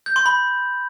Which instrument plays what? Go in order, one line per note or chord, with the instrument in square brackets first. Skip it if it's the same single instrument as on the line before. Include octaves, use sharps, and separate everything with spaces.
[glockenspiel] G6
C6
B5